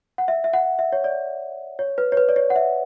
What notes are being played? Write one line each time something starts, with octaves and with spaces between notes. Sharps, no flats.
F#5
E5
E5
F#5
E5
C#5
D5
C#5
B4
C#5
B4
D5
C#5
F#5
E5